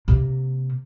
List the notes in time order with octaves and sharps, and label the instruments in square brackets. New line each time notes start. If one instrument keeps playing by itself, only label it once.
[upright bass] C3 A#3